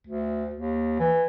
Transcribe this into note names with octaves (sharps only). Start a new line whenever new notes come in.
D2
D#2
E3